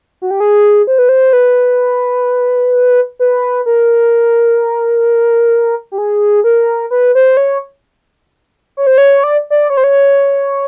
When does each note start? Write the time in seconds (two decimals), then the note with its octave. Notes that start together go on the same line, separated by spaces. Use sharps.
0.22 F#4
0.31 G4
0.40 G#4
0.87 C5
0.98 B4
1.09 C5
1.33 B4
3.19 B4
3.66 A#4
5.92 G4
5.98 G#4
6.44 A#4
6.91 B4
7.15 C5
7.37 C#5
8.77 C#5
8.87 C5
8.98 C#5
9.24 D5
9.50 D5
9.70 C#5
9.77 C5
9.84 C#5